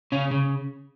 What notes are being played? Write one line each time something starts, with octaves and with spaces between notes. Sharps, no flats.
C#3 C#4
C#3